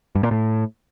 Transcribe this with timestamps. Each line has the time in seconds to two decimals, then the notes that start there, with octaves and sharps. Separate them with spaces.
0.15 G2
0.23 A#2
0.31 A2